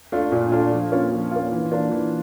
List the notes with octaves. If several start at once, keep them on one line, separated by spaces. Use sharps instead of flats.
A3 D4 F4
A#2
A3 D4 F4
F3
A#3 C#4 F4
F3
A#3 C#4 F4
E3
A#3 D4 F4
E3